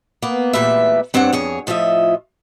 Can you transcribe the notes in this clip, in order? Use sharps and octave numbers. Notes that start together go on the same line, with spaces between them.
A#3 B3
E2 A#2 G3 A3 B4 E5
G2 C4 D4 C#5 F#5
F2 G#4 C#5
A2 F3 F4 D#5 E5